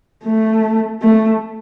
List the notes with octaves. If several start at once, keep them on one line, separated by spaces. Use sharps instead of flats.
A3
A3